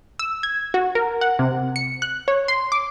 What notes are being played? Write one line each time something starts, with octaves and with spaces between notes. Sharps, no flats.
E6
G#6
F#4
A#4
F#5
C3
C#7
F#6
C#5
C6
D6